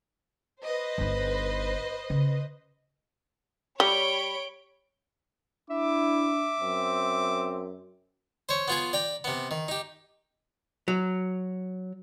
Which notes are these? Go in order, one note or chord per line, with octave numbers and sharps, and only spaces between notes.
B4 C5 D#5
G1 D#4
C#3
G3 C#5 B5 D7 G7
D4 E4 E5 D6
F#2 C4
C5 C#5
B3 F4 G#4
D5 G5 A#5
C3 B3
D#3
D#4 G4
F#3